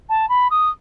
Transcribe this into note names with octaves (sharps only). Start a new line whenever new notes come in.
A5
B5
D#6